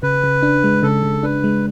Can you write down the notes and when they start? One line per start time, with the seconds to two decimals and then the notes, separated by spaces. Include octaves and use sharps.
0.03 C#3 B4
0.24 C#3
0.43 D4
0.64 G#3
0.83 C#3 A4
1.03 C#3
1.23 D4 B4
1.44 G#3